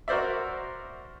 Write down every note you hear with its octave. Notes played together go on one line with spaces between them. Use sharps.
F#4 A#4 C5 D5 E5